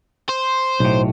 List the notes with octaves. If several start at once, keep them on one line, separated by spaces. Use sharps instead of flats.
C5
B1 A2